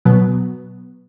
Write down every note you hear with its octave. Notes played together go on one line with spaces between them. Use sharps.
B2 F#3 B3